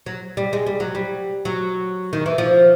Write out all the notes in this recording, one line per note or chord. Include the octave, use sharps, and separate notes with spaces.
F#3
G3
G#3
G3
F#3
G3
F#3
D#3
E3
F3